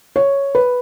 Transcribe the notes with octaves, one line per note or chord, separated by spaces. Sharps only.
C#5
B4